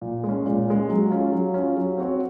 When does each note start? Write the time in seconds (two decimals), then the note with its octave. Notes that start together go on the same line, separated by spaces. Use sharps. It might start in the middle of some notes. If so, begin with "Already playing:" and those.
0.01 A#2
0.24 G#3
0.29 C#4
0.46 A#2
0.67 G#3 C#4
0.89 F#3
1.11 C#4 F4
1.32 F#3
1.54 C#4 F4
1.77 F#3
1.98 C4 F#4 C#5